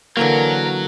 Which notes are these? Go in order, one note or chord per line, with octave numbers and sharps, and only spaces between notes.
D3 E3 F#3 A#3 A#4 G5